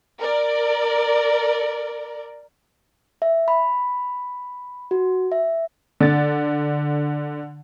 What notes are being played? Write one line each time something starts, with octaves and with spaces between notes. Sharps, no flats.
A#4 D5
E5
B5
F#4
E5
D3 A6